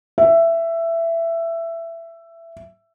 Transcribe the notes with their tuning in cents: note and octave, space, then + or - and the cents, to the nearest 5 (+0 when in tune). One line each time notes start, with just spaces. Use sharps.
E5 +15